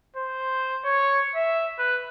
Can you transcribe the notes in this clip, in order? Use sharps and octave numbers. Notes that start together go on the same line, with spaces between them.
C5
C#5
E5
B4